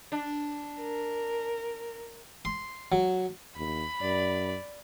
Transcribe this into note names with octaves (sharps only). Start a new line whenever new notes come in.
D4
A#4
C6
F#3
D#2 B5
F#2 D5